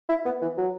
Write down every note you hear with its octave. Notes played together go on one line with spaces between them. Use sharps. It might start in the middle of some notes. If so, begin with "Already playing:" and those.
E4
B3
E3
F#3